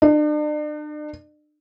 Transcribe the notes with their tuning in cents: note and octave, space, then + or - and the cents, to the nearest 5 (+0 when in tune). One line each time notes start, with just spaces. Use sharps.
D4 +40